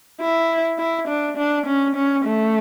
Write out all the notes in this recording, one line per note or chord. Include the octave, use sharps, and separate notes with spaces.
E4
E4
D4
D4
C#4
C#4
A3